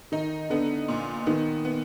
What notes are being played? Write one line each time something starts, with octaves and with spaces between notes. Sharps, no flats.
D#3 D#4
D3 B3
A#2
D#3 B3
B3